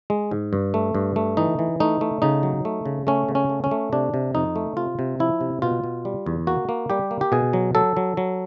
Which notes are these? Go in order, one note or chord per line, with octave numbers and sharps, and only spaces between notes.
G#3
G#2
G2
A3
G2
A3
E3 D#4
E3
A3 D#4
A3
C#3 D#4
F#3
A3
C#3
A3 C#4
C#3
C#4
A3
C#4
A3
C3 D4
C3
F2 D#4
A3
C3 F4
C3
F3 E4
C3
B2 F4
B2
G3
E2
A#3 F#4
A#3
G3 G4
A#3
G4
B2 G#4
F#3
F#3 A4
F#3
F#3